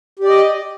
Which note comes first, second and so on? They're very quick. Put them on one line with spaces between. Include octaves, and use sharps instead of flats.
G4 D5 D#5